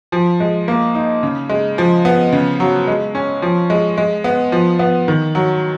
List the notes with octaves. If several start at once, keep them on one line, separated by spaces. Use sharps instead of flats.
F3
G#3
A#3
D#4
C#3
G#3
F3
B3
C#3
F#3
G#3
C#4
F3
G#3
G#3
B3
F3
B3
D#3
F#3